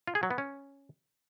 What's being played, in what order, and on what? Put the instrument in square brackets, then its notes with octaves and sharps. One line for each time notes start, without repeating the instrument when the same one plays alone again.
[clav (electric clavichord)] F4
G#4
F#3
B3
C#4